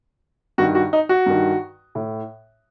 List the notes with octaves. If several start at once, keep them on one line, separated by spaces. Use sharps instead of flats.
G2 D#3 F#4
F#4
D#4
F#4
G2 D#3
A2